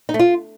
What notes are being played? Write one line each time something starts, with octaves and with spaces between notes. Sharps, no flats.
D#4
A3
F4